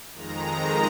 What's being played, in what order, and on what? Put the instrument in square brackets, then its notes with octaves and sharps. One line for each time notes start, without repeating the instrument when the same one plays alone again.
[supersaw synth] F2 D#3 G#3 A#5